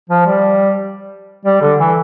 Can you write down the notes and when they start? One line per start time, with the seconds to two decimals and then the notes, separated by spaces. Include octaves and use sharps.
0.10 F3
0.26 G3
1.45 G3
1.62 D3
1.79 E3